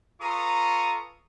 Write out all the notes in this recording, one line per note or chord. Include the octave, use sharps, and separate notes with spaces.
F4 A4 B4 A#5 C#6 D#6